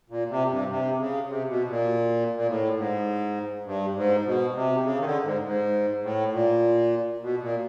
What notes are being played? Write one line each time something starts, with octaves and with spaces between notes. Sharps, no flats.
A#2
C3
G2
C3
C#3
C3
B2
A#2
A#2
A2
G#2
G2
G#2
B2
C3
C#3
D#3
D3
G#2
G#2
A2
A#2
B2
A#2